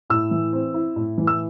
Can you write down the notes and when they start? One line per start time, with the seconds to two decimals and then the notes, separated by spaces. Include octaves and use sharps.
0.10 A2 E6
0.31 E3
0.53 C4
0.74 E4
0.96 A2
1.18 E3
1.27 E6